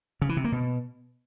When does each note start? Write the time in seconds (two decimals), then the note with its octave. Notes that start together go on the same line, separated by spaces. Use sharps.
0.22 C#3
0.29 E3
0.37 C3
0.44 A#3
0.52 B2